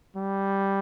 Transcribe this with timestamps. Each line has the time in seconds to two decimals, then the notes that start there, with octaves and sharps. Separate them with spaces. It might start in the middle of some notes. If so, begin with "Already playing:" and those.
0.15 G3